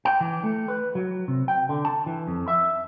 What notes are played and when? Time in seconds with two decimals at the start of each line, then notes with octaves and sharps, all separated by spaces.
0.05 G5
0.21 E3
0.43 A3
0.68 B4
0.95 F#3
1.28 C3
1.48 G5
1.69 D3
1.85 A5
2.06 E3
2.28 F2
2.48 E5